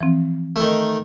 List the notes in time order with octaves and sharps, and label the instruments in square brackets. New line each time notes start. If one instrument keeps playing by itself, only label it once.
[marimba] E3 F3 C4
[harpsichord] D#3 A3